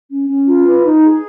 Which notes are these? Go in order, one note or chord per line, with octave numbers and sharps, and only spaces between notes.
C#4
C#4
F4
B4
D#4
G#4